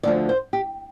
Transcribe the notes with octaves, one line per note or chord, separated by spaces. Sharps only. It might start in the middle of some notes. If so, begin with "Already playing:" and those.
D2 D3 F3 D5
C5
G4